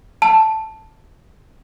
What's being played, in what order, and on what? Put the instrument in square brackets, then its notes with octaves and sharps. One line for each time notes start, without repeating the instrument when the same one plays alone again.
[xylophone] A5